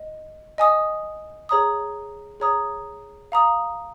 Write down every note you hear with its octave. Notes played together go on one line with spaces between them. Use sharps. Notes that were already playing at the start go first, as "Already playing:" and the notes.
Already playing: D#5
D#5 G#5 D#6
G#4 C#5 A#5 D#6
G#4 C#5 A#5 D#6
F5 A#5 D#6